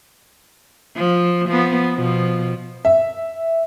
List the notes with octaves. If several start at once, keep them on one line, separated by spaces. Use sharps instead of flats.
F3
F3 B3
B2 F3
E5